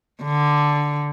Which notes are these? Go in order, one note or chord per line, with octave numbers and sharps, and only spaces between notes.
D3